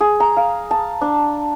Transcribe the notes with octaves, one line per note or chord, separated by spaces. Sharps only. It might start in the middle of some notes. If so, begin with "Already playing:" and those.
G#4
A#5
F5
A5
D4